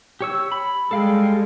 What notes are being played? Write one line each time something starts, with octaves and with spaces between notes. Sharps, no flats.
G4 C#5 E6
B5
G3 G#3 A4 F5 G5